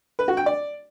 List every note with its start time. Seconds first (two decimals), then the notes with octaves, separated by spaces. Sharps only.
0.19 B4
0.28 F#4
0.37 G5
0.46 D5